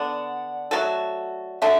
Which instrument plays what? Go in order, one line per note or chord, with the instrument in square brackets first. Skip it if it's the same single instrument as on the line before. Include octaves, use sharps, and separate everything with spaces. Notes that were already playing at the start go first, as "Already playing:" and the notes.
Already playing: [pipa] D3 B3 D4 [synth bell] D5 F#5
[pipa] F#3 A3 F#4 A4
[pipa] D3 F#3 A3 [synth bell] E5 A5